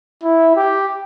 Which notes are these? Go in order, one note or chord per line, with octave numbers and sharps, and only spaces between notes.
E4
G4